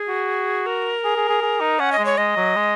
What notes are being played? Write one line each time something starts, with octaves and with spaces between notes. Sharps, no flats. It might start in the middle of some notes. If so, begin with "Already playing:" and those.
Already playing: G#4
F#4
A#4
G#4
G#4
G#4
G#4
D#4
C#4 F#5
D#5
G#3
C#5
G#3 D#5
F#3
G#3